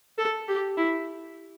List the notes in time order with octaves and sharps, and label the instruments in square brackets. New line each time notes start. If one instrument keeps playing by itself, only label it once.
[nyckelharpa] A4
G4
E4